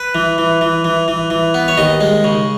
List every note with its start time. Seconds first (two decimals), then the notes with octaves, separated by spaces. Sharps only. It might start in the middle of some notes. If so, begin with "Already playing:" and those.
Already playing: B4
0.15 E3
0.38 E3
0.61 E3
0.84 E3
1.08 E3
1.30 E3
1.54 B3
1.68 C#5
1.78 D#2 D#5
2.01 G#3
2.24 C#3